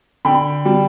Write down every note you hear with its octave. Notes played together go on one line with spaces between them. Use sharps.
D3 G5 B5
G3